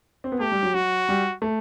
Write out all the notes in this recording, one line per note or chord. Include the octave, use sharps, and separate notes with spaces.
C4
B3
A3 G4
G3
F#3
F#3 F#4
G3
A3